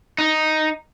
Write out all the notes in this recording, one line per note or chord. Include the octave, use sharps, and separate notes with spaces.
D#4